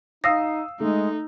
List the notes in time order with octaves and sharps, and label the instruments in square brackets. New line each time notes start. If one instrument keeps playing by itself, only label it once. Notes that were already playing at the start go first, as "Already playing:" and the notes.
[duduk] D#4 [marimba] F5 A#6 [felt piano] D#6 E6 C7
[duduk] G#3 [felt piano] A3 [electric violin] D#4